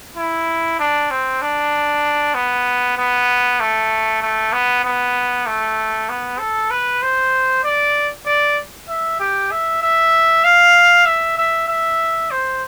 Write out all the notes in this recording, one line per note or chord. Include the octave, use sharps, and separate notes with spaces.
E4
D4
C4
D4
B3
B3
A3
A3
B3
B3
A3
B3
A4
B4
C5
D5
D5
E5
G4
E5
E5
F5
E5
E5
E5
C5